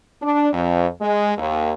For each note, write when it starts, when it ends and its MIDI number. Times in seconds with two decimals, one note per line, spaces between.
0.21 0.48 62
0.53 0.87 41
1.01 1.32 56
1.38 1.72 39